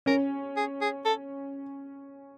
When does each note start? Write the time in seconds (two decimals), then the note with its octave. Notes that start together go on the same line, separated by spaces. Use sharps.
0.06 C#4 A#4
0.57 G#4
0.81 G#4
1.05 A4